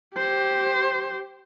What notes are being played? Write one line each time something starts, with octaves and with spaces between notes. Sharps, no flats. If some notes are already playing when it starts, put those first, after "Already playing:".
G4 C5